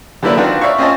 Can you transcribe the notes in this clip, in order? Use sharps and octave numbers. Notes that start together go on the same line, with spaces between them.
D3 G3 A#3 E4 B4 D5
D#3 C4 D4 F4 F#4 B4
C#5 D5 E5 F5 C#6
C4 C#4 F4 C#5 D#5 A5